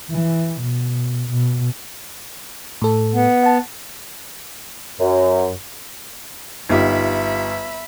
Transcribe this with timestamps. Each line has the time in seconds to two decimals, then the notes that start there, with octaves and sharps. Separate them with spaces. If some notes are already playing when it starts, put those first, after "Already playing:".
0.11 E3
0.61 B2
1.30 B2
2.82 A2 A4
3.14 B3
3.43 F#5 A5
5.00 F#2
6.69 G1 D#4 F4 G4 E5 B5